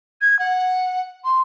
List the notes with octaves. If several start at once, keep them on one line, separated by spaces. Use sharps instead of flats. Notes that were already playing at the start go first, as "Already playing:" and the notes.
G#6
F#5
C6